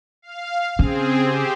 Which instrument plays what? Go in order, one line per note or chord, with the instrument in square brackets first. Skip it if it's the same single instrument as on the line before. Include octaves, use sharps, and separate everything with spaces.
[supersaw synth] F5
[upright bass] C#3 [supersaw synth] C4 G#4
[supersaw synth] G4 C5